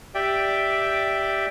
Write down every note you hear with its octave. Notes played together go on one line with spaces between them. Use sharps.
G4 D5 E5 G5